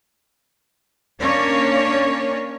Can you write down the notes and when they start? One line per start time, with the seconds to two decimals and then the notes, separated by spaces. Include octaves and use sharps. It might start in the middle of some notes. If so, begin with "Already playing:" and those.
1.21 A#3 C#4 D4 C#5